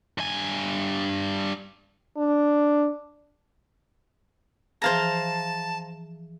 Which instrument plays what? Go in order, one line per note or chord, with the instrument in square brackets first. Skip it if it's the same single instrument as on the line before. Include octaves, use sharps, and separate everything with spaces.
[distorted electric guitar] G2 G#5
[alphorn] D4
[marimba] E3 F3 G#4 [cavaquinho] C5 F5 A#5 [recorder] A5